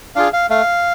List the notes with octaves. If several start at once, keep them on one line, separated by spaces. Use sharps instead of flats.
D4 F4 G#4 F5
F5
A3 F5